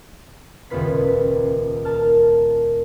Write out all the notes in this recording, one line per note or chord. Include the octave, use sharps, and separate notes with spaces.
D#1 C#2 B3 F4 B4 B6
A#4 A5 F6